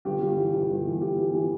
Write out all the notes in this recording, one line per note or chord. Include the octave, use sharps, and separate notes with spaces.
G1 G4
G3
E3
G1
G1
E3
G3 G4
E3
E3